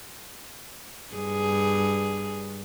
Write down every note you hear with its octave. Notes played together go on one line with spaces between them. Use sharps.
G2 G#4